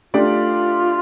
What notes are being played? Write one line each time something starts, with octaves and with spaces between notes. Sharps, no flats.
A3 D4 F4 G4 D5